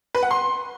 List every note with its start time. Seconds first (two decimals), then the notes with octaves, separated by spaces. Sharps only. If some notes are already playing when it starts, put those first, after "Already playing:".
0.15 B4
0.23 F#5
0.31 C6